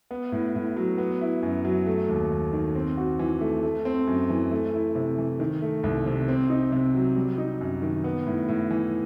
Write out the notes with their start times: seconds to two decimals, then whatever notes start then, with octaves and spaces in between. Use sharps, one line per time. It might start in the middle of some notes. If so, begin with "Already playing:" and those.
0.11 B3
0.32 A2
0.55 A2
0.76 F#3
0.98 B3
1.21 E4
1.43 F#2
1.65 F#3
1.86 A3
2.09 D#2
2.31 D#2
2.53 D#3
2.75 C4
2.97 F#4
3.19 E3
3.41 A3
3.63 A3
3.85 C4
4.07 F#2
4.30 E3
4.51 A3
4.74 E4
4.95 C3
5.18 E3
5.40 D#3
5.62 A3
5.83 C2
6.06 C3
6.28 C4
6.50 D#4
6.72 C3
6.94 F#3
7.16 G3
7.38 D#4
7.61 F#2
7.82 D#3
8.04 B3
8.27 A2
8.48 A2
8.71 E3